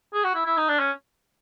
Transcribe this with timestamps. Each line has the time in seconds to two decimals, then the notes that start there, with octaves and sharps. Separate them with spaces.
0.14 G#4
0.24 F#4
0.35 E4
0.46 E4
0.57 D#4
0.69 D4
0.79 C#4